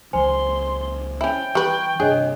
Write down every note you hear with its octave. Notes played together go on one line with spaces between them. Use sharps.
C#2 E3 F#3 C5 G#5 C6
C#4 E4 G5
E3 G3 B4 C#6
G2 C3 D4 G#4 C#5 D#5